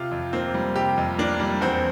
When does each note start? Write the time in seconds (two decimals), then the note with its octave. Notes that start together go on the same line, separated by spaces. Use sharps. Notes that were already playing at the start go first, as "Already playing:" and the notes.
Already playing: C3 F4
0.11 F2
0.33 A#3 C4
0.54 G3
0.76 C3 G4
0.98 F2
1.19 A#3 D4
1.40 G3
1.61 E2 C4